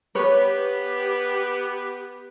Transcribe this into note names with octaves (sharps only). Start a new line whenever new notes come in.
B3 G4 B4 C#5